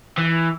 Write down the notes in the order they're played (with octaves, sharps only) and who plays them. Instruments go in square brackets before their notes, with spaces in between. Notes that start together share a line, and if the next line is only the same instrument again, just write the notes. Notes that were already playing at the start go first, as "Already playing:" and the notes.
[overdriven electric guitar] E3